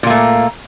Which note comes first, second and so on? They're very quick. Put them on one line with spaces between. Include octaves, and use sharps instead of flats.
A#2 A#3 A3